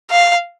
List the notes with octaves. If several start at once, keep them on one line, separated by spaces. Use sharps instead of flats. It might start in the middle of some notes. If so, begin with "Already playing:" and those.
F5